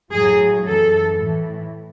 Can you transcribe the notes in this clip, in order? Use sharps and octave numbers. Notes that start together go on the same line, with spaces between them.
A2 F#3 G#4
F#2 E3 A4
A2 E3